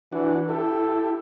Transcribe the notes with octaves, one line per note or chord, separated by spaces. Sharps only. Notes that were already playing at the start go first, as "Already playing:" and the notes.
E3 D4 F#4
E4 G4 A4